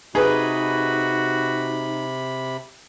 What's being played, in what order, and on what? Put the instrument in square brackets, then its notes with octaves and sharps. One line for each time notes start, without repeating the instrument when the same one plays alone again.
[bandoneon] C3 B5 [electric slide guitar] D#4 [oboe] F#4 [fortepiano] G#4 B4